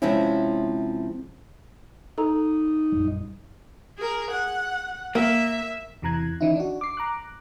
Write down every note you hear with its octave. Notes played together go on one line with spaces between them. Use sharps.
C3 F3 G#3 C4 C#4 E4
D#4 A4 A#5
A#1 F#2 G3
G#4 A#4
F#5
A#3 E5
E2 C3 E3 A#5 F#6 G#6
D#3 E3 C#4 D#4 E4
D4 F#4
D6 C7
A#5 D6 F#6